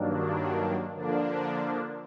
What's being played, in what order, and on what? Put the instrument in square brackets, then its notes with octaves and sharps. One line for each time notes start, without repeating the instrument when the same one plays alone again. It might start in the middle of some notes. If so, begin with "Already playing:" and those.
Already playing: [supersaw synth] G2 D#3 F#3 A#3 D4
D3 F3 A#3 D4